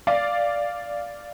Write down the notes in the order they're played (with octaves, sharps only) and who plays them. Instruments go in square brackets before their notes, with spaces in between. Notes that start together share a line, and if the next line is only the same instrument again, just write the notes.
[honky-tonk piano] D5 F5